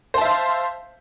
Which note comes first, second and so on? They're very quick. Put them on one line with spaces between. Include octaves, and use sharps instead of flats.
C5 A5 E5 F5